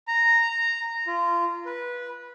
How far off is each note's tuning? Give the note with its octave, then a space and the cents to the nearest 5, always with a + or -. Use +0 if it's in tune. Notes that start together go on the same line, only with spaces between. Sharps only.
A#5 -10
F4 -25
B4 -15